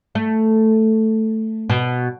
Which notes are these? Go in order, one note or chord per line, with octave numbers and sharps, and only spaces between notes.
A3
B2